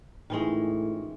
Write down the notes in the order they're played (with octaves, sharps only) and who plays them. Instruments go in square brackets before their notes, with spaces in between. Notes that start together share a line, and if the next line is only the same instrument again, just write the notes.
[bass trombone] A2 [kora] D#3 E3 G#3 [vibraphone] C#4 D#4 F4